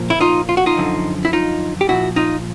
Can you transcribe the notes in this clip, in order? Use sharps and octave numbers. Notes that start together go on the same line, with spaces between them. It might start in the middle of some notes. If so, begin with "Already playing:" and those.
Already playing: A#2 F3
E4
D#4 F4
F4
F#4
D#4 F4
F#2 D3 F3
E4
D#4 F4
G4
A#2 F3 E4 F#4
D#4 F4